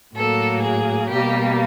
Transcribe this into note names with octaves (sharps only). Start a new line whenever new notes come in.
A2 F#3 A#3 A4
G#4
B2 G3 A#3 G4